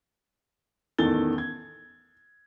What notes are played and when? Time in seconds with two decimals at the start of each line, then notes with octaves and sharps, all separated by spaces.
0.98 A1 E2 D#3 A4 A6 G7
1.38 G#6